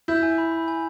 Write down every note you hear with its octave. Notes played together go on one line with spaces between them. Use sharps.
E4 G6
G#5
B5
B5
G#5